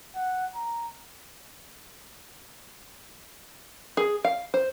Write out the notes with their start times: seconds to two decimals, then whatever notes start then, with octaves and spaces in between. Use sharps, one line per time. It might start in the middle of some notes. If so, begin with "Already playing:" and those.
0.16 F#5
0.55 A#5
3.97 G#4
4.25 F5
4.54 C5